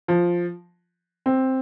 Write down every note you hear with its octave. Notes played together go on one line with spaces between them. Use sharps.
F3
C4